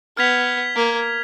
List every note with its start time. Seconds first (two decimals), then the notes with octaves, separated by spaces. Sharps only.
0.17 B3 F6 G#6 B6 F7
0.76 A#3